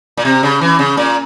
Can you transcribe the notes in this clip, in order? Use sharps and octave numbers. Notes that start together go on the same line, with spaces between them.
A#2
C3
C#3
E3
C#3
A#2